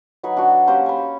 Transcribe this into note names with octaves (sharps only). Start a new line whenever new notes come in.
F#3 D#4 B4 G#5
D4 F#4
A#3 C#4 G4 C5
G#5 B5